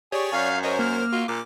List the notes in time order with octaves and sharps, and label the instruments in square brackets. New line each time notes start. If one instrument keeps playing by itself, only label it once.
[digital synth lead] G4 [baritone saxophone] G#4 [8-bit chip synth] C#5 D5 C#6
[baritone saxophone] F#2 [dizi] F5 [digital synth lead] G#5
[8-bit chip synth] A#4 C5 [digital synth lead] C#5 [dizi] D#5
[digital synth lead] A#3 [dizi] F6
[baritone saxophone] F4 [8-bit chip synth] F#4
[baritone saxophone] A#2 [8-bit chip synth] D6